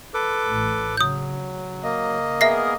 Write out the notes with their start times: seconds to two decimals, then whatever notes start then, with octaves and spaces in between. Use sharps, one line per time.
0.14 A4 B4 D6
0.47 A1 A2
0.97 C#3 F#3 D#6 G6
1.46 C#3
1.83 A#3 D#5
2.41 B3 G#4 A#4 E5 A#6 C7